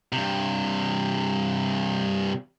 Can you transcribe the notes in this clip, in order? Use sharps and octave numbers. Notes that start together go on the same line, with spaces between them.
G2 C3